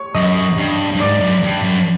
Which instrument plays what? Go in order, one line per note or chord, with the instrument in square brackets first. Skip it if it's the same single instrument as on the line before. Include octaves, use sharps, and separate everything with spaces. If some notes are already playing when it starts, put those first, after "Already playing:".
Already playing: [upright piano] C#5 C#6
[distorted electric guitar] F#2 [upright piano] D#5 D#6
[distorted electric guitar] G2
G2
[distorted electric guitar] G#2 [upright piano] D5 D6
[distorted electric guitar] F#2
G2
F#2